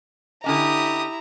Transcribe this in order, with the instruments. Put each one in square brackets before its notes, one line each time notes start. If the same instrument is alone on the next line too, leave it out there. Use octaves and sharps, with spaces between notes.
[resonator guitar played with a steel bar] D3 C#4 D#5 [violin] E4 A#5 [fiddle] G4 D#6